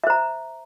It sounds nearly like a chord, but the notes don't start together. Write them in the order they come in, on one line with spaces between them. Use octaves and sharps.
E5 C5 A#5